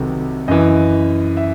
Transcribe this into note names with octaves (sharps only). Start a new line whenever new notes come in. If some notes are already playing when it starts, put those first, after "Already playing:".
Already playing: C2 C3 D#3 F#3 A4 B4
F#2 E3 D#5
E5